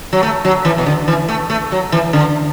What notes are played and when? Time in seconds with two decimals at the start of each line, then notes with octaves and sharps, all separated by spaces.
0.13 F#3
0.23 A3
0.45 F#3
0.65 E3
0.78 B2
0.86 D3
1.08 E3
1.29 A3
1.50 A3
1.72 F#3
1.92 E3
2.13 D3